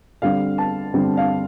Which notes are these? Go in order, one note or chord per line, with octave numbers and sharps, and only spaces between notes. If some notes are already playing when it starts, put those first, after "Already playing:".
D3 G3 C4 F5
A5
D3 G3 C4
F5